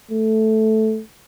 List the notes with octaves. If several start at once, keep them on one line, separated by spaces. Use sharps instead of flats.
A3